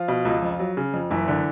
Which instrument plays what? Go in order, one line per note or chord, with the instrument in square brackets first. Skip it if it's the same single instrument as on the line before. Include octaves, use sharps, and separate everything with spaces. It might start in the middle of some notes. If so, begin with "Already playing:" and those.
Already playing: [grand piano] F3 F4
B2
C#2
F2
F#3
C#3
F2
F#1 E3 E4
D3